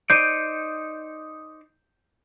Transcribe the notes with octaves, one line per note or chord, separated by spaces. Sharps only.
D#4 C5 D5 G6 D7 D#7